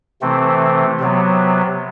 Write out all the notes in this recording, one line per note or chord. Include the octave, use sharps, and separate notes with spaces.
C3 E3 A3 C4
C3 F#3 B3